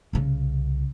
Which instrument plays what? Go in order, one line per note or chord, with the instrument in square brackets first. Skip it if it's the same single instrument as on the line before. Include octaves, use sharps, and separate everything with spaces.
[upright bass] C2 C#3